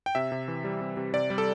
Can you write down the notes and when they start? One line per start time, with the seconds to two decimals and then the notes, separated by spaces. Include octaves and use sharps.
0.06 G5
0.15 C3 E5
0.32 C3
0.48 E3
0.64 G3
0.81 C3
0.97 C3
1.13 C3 D5
1.30 G3
1.38 A4